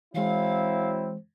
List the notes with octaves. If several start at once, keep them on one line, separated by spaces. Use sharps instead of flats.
E3 F#3 G#3 C4 E4 F5